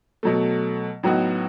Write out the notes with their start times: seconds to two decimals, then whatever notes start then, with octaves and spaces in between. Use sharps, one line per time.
0.23 B2 F#3 A3
1.03 A2 F#3 B3 D#4 F#4